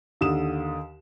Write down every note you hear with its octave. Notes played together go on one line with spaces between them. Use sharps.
D#2 D3 D#6 E7